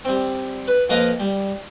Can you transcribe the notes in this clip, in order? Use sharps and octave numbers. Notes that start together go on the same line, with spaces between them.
G3 C4
B4
F2 A#3 A#4 B4 D#5 F5
G3